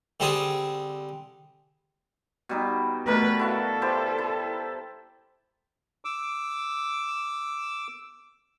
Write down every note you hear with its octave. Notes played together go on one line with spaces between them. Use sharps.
D3 G3 C4 D4 G#4
B2 G3 D#4
B2 A3 D4 A#4 B4
E4 F#4 A4 F5
E4 G4 C5
E4
D6 E6